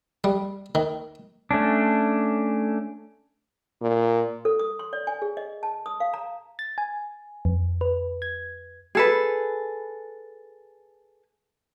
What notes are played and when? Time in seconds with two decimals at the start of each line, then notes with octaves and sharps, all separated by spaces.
0.24 G3
0.75 D#3
1.51 A3 C#4 D4
3.81 A#2
4.45 A4
4.59 D#6
4.79 C6
4.93 D5
5.07 G#5
5.22 G#4
5.37 D#5
5.63 A5
5.86 D#6
6.00 F5
6.14 A#5
6.59 A6
6.78 G#5
7.45 F2
7.81 B4
8.22 G#6
8.95 G#4 A4 B4